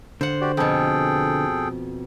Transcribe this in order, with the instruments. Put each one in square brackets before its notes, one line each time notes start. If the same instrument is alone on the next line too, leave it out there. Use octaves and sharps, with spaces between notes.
[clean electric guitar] D3 [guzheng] C5 F#5
[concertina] F#4 G4 D5
[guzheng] F2 B2 [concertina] G#4 A4 G5